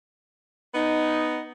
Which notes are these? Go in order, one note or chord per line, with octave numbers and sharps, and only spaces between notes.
B3 D#4